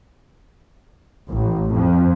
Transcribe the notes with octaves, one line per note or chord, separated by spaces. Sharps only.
A1
F2